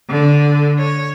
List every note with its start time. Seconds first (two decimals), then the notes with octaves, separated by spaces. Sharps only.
0.10 D3
0.78 C#5